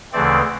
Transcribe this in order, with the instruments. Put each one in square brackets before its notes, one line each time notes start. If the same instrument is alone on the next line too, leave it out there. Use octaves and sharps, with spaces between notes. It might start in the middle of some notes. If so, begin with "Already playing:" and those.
[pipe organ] D2 C#3 E3 A3 C4 D5